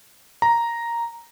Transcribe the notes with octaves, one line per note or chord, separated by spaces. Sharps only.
A#5